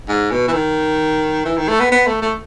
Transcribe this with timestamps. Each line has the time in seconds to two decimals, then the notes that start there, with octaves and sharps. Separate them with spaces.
0.09 G#2
0.31 B2
0.48 E3
0.53 D#3
1.45 E3
1.57 D#3
1.68 A3
1.80 B3
1.92 B3
2.07 A3
2.22 A3